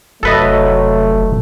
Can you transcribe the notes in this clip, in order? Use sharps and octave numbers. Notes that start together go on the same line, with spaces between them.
F1 F#3 A3 A4 B4 D#5